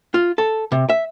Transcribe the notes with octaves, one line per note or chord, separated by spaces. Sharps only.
F4
A4
C3
E5